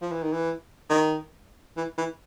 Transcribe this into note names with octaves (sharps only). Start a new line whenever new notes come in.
F3
E3
D#3
E3
D#3
E3
E3